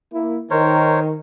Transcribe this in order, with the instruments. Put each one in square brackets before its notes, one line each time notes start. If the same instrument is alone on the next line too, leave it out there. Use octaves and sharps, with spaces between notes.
[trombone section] A#3 E4
[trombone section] D#3 [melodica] A#4 C5 C#5